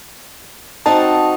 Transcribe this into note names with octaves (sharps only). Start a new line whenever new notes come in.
C4 D#4 F#4 A5